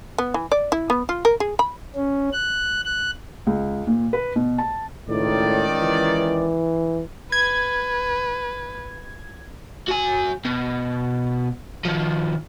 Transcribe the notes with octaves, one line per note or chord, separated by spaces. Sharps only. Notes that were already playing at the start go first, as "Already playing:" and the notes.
B3
E3
D5
E4
B3
F4
A#4
G#4
B5
C#4
F#6
F#6
C#2
A#2
B4
B2
A5
C#2 A2 D#3 D5
E3
B4 G#6
F#4 G#5
B2
D#3 F3